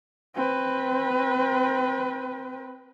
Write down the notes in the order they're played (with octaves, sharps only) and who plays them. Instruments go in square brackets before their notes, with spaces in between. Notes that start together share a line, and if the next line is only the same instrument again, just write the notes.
[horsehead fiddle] C4 B4